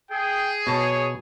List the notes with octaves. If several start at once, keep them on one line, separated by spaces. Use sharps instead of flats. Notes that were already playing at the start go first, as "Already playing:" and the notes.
G#4 G5
B2 C#5 A5